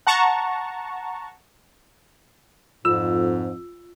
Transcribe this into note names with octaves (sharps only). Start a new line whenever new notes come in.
F#5 A5 A#5 C#6
F2 G#2 F4 E6